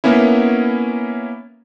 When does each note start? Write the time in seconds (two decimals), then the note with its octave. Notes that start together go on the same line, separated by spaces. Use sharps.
0.04 A#3 B3 C#4 E4